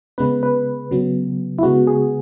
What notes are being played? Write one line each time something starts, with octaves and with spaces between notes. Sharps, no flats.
C#3 G#3 B3 B4
B4
C#3 F#3 B3
E4
C#3 G#3 B3 F#4
G#4